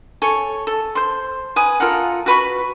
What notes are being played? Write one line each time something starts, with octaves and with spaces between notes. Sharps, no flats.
A4 C#5 G#5
A4
C5 C6
B4 G#5 D#6
F4 A4 A#4 F#5
F#4 B4 B5 C#6